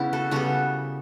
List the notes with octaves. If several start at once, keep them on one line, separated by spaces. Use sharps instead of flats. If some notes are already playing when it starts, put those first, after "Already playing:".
Already playing: C#3 B3 C#4 E4
F#4 A4
C#3 G3 B3 F#4 A4